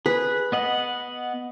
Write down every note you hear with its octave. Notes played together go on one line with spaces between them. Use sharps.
G#4 B4
B3 D#5 F#5